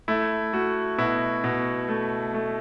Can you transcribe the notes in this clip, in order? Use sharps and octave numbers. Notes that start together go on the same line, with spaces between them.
A3 E4
A3 F#4
B2 E4
B2
A3
A3